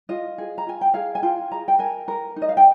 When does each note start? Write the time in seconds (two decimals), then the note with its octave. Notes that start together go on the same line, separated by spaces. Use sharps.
0.09 F4 D#5
0.38 G#4
0.58 A#5
0.67 F4 G#5
0.81 G5
0.94 G#4 F5
1.15 G#5
1.23 F4 G5
1.51 G#4 A#5
1.68 G5
1.79 A#4 G#5
2.08 A#4
2.36 D#4
2.42 D#5
2.49 F5
2.57 G5